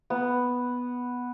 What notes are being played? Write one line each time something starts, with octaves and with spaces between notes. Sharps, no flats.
B3